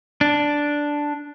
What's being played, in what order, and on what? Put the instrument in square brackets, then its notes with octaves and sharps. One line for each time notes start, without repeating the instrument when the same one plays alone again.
[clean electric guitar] D4